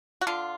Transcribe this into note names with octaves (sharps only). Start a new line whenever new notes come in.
F#4
D3 F4